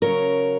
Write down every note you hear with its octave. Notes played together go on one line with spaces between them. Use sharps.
C#3 F#3 C#4 A#4